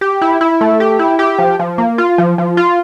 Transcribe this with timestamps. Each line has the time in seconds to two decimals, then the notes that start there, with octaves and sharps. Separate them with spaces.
0.01 G4
0.22 E4
0.41 E4
0.61 A3
0.80 G4
0.99 E4
1.19 G4
1.39 F3
1.59 F3
1.78 A#3
1.98 F4
2.18 F3
2.38 F3
2.57 F4